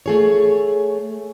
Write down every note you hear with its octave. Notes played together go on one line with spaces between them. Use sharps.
A3 G#4 C#5